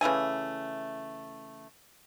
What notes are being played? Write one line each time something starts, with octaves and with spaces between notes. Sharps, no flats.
C#3 E3 A3 G#5